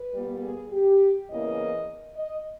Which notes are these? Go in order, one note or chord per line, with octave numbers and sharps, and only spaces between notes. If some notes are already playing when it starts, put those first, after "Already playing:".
Already playing: B4
A#2 G3 B3
G#4
G4
E2 C#3 E3 A#3 D#5
D#5